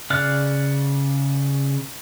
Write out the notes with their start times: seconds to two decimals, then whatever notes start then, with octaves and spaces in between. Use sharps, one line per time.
0.10 C#3 D5 F6 F#6